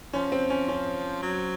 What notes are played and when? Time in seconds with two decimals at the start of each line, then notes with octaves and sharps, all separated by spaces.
0.13 F3 C#4
0.32 C4
0.50 C#4
0.68 C#4
1.22 F#3